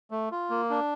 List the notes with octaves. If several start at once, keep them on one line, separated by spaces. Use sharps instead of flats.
A3
F4
A#3
D4